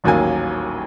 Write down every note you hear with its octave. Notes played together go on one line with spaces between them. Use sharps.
D#1 A1 D#2 F#3 A#3 G#5